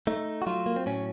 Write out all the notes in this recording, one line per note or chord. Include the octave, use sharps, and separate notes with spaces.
A3 D#4
F#4
F#3 F4
A#3
C4
A2 C#4